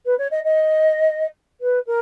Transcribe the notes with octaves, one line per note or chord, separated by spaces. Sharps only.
B4
C#5
D#5
D#5
B4
A#4